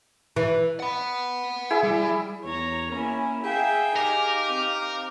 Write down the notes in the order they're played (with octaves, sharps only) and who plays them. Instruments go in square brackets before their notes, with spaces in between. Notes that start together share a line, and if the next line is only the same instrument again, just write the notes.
[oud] E3
[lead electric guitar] F#5 B5
[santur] E4 G#4 E5
[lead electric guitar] G3
[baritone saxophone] E2 [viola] C#5 A#5
[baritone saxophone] A#3 [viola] C#4 E4 [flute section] C#5 G#5
[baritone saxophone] G#4 [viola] E5 G5 [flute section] F5 A#5
[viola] D#4 G4 [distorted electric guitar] A#4 [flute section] F5 D6
[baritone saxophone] C4